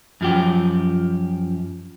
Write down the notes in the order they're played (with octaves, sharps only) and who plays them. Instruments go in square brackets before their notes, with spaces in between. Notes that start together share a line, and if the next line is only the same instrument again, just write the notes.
[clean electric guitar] F#2 F3 G4